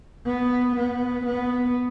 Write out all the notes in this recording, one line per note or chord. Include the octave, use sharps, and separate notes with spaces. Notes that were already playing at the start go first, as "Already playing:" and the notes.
B3
B3
B3